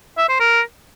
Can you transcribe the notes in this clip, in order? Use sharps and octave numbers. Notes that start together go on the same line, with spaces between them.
E5
C5
A#4